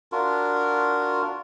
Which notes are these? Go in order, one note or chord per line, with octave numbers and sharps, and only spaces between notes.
D4 F4 F#4 A#4